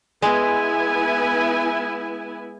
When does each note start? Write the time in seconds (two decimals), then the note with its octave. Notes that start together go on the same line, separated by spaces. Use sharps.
0.22 G#3 B3 E4 G#5